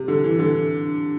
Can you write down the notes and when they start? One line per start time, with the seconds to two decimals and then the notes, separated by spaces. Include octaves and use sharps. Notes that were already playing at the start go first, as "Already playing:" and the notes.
Already playing: C3
0.08 D3
0.24 E3
0.39 D3